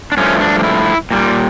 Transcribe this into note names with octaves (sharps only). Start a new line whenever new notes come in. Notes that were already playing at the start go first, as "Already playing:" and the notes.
D4
G2 F3 A3 C#4
D4
D4
E4
A#2 G3